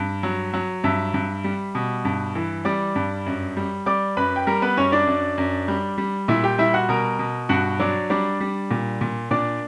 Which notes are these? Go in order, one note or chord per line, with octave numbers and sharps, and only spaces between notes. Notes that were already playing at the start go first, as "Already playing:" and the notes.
Already playing: G2
F#3
F#3
G2 E5 E6
G2
G3
B2
G2
E3
G3 D5 D6
G2
F#2
G3
G3 D5 D6
F#2 B4 B5
G5
G3 A#4 A#5
B3 B4
F#2 C#4 C#5
D4 D5
F#2
F#2
G3
G3
A#2 E4 E5
G4 G5
G3 E4 E5
F#4 F#5
B2 A#4 A#5
B2
G2 F#4 F#5
F#3 D4 D5
G3 D4 D5
G3
A#2
A#2
A#2 D4 D5